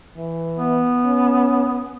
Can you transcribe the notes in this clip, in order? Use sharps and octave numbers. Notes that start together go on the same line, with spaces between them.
E3
B3
C#4